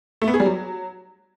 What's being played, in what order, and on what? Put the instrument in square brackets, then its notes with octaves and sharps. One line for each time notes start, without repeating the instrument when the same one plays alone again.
[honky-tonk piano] A3
B3
G#4
G3
F#3